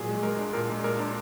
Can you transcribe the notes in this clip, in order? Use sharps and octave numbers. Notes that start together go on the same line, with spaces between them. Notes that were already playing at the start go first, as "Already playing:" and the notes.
Already playing: A#2 F#3 G#4
G#3
G#3 A#4
D4
A#2 A#4
G#3
A#2 A#4
D4